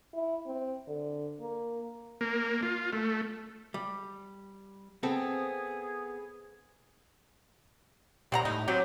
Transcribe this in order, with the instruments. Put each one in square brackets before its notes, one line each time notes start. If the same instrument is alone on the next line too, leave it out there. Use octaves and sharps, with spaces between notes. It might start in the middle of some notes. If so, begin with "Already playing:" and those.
[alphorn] E4
C4
D3
A#3
[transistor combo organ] A#3
F4
A3
[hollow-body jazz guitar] G3
[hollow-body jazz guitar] B3 C4 A4 [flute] G#4
[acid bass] A#2 [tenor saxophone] G3 [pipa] C4 F#5 A#5
[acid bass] A2 [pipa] D#4
[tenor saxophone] F#3 [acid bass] C4 [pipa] G4